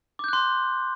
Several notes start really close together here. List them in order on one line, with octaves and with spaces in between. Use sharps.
D6 G6 F#6 C6